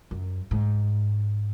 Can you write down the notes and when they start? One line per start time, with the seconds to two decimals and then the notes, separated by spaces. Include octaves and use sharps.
0.11 F#2
0.51 G#2